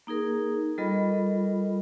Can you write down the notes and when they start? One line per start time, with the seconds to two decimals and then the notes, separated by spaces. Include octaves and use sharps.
0.07 A#3 D#4 G#4 A#4
0.78 G3 F4 A4 A#4 D#5 B5